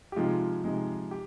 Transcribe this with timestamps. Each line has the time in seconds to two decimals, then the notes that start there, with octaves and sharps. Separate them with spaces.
0.12 G4
0.16 C3 F3 G#3 D#4 F4 G#4
0.64 C3 F3 G#3 D#4
1.11 G4